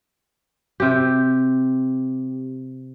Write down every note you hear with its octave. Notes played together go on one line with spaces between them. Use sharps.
C3 G4